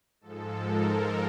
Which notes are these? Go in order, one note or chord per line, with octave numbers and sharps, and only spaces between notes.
G#2 F3 G#3 A4
A#4